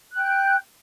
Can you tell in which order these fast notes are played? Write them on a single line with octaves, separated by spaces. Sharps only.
F#6 G5 G6